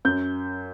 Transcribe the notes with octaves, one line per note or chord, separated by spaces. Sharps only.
F#2 G6